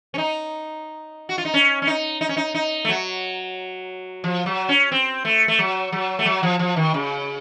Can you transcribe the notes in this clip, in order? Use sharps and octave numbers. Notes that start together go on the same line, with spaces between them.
C#4
D#4
F#4
F4
D#4
C#4
C#4
D#4
D#4
C#4
D#4
D#4
A3
F#3
F3
F#3
C#4
C4
A3
A3
F#3
F#3
A3
F#3
F3
F3
D#3
C#3